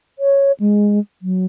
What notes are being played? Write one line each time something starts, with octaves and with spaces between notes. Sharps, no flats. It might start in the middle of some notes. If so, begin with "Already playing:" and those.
C#5
G#3
F#3